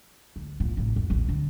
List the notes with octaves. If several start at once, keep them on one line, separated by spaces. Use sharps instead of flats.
D2
A1 A#2
A1 C3
F2
A#1 D#2
D3